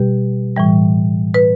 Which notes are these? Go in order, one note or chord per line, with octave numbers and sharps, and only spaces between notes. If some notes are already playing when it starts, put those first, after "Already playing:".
Already playing: B2 G3 G4 B4
A2 E3 G3
B4